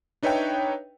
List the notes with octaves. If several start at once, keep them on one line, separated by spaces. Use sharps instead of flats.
D4 D#4 B4 C#5 E5 G5